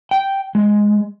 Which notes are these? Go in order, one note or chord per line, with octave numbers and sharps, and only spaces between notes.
G5
G#3